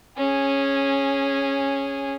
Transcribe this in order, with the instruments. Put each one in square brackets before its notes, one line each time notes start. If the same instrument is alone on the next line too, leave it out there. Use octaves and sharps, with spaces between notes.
[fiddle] C#4 G#4